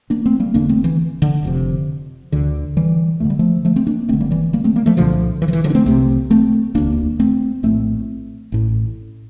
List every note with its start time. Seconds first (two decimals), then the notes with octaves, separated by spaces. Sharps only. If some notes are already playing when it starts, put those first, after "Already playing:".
0.10 A#3 D4
0.25 A3 C4
0.40 G3 A#3
0.54 E1 E2 D3 A#3 D4
0.69 A3 C4
0.84 E3
1.22 D3
1.43 F1 F2 C3
2.32 D2 D3
2.77 E3 G3
3.20 D2 A3
3.25 D3
3.30 G3
3.39 F3 A3
3.65 F3 A3
3.76 A3 C4
3.87 A#3 D4
4.09 G1 G2 D3 A3 C4
4.20 G3 A#3
4.31 E3 G3
4.53 G3 A#3
4.64 A3 C4
4.76 G3 A#3
4.86 F3 A3
4.97 C2 A#2 D3 F3
5.42 E3
5.48 F3
5.53 E3
5.64 D3 F3
5.70 D4
5.75 A3 C4
5.86 C2 C3 A3 C4
6.31 A3 C4
6.74 E1 D2 D3 A#3 D4
7.19 A3 C4
7.63 A#1 A2 A3 C4
8.52 A1 A2